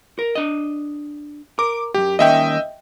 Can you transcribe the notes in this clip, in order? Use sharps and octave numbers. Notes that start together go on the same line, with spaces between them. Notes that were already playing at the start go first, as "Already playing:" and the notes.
A#4
D4 D#5
A#4 D6
C2 F#2 G4
D#3 A#3 C#4 D#5 E5 G5